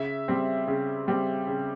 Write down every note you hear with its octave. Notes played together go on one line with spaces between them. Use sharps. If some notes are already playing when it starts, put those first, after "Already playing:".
Already playing: C#3 E5
G3 C4
C#3
G3 C4
C#3